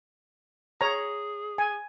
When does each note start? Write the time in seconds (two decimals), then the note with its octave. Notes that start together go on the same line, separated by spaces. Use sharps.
0.81 G#4 C#5 A#5
1.58 G#5